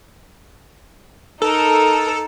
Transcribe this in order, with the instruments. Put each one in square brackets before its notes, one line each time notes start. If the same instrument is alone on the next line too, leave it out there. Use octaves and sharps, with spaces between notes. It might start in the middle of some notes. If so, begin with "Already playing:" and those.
[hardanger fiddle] D#4 A#4 [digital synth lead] A4